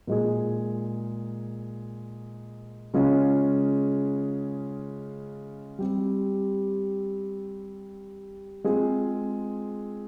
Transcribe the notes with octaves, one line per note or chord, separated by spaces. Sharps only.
A#2 G#3 D#4 G#4
C#3 G#3 C#4 F4 G#4
G3 C4 G4
G#3 C4 F4 G#4